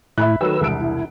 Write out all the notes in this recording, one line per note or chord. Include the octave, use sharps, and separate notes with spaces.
A2 E4 E5 B5 F#6
D#3 F#3 A3 B4 E6
E1 C2 D7
E4